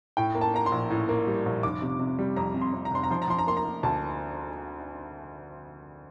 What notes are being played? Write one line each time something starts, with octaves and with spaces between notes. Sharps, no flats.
A2 G5
A#3
A5
A#3 A#5
C6
A#1
A2
A#3
G3
A#1
F1 D6
C3
C3
G3
F2 A#5
C3
C6
F2
A#5
F1 C6
A#5
F3 C6
A#5
F3 C6
A#5
A#3 C6
A#5
A#3
D2 A5